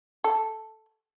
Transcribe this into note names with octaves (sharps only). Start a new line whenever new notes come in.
A4